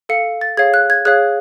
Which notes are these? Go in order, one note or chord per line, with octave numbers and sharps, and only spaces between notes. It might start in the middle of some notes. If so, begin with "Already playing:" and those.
A4 F5 C#7
A6
G#4 C#5 F5 G#6
F#6
G#6
G#4 C#5 F5 F#6